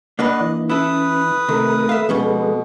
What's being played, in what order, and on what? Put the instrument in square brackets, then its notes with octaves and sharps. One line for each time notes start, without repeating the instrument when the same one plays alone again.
[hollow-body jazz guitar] A#3 D4 B4 [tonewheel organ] D5 F#5 [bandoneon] D#5
[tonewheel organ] E3
[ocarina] C#4 [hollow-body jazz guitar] E4 A4 [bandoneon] B4 D#6
[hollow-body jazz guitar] C3 D#3 [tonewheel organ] A3 A#4 [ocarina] A4
[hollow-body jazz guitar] E5 F5
[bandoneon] B2 [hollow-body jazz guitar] F3 G3 C#4 [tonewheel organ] G#3 B3